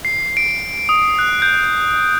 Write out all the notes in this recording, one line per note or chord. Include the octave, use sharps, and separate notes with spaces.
C7
D7
D#6
F#6
G6